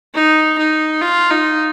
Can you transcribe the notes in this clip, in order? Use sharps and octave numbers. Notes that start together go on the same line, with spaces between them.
D#4
D#4
F4
D#4